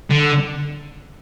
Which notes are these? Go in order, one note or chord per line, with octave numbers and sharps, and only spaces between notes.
D3